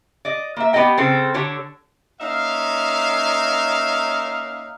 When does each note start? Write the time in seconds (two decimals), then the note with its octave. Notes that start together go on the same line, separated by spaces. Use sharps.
0.25 D5 D#5
0.57 A#3 E5
0.73 B3 G4 D5 D#5 G5
0.97 C#3 C4 A4
1.34 D3 G4 C#5 A5
2.21 A#3 C#4 D#4 E5 F5